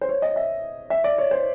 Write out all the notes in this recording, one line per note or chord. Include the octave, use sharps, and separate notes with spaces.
C5
C#5
D#5
E5
E5
D5
C#5
C5